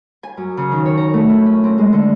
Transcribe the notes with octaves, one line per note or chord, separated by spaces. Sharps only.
G#5
F#2
C#3
D#3
C#5
A#5
A3
E4
C#4
C4
G#3
D3